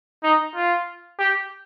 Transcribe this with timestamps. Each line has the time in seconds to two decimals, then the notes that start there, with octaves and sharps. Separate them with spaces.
0.23 D#4
0.55 F4
1.19 G4